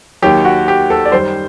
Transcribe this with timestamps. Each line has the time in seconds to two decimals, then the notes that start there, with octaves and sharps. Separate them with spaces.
0.22 D#2 D#3 F#3 G4
0.45 F#4
0.68 G4
0.90 A4
1.05 D5
1.12 F#2 D#3 G3 C5